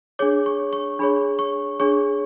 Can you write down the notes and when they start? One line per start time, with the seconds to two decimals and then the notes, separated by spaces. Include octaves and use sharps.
0.19 D4 G#4 C#5 D6
0.46 C#6
0.73 C#6
0.99 D4 G#4 C#5 B5
1.39 C#6
1.80 D4 G#4 C#5 C#6